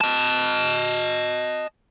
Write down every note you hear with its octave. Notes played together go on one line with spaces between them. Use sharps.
D#5 A5